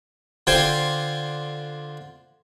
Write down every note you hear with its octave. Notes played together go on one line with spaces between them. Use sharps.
D3 F4 C5 G5 G#5